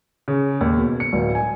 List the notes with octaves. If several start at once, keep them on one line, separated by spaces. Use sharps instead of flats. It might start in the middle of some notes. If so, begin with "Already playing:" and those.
C#3
D#2
B2
C#7
D1
G#5